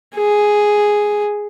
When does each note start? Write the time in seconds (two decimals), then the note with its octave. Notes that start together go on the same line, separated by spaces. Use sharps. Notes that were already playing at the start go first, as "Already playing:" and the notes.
0.16 G#4